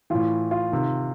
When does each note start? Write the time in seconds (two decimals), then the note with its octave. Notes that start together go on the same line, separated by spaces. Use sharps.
0.10 A2 E3 F4
0.51 F4
0.72 C3 D#3